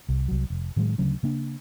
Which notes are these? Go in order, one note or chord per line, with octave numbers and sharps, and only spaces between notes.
C2
C2 F#3
F1
A2 D#3 F#3 G#3
D2 C#3 F#3 C#4
C#3 A#3 D4